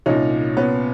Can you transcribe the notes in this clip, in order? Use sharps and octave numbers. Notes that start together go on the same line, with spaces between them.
C2 A#2 C#4 D#4
B3 C#4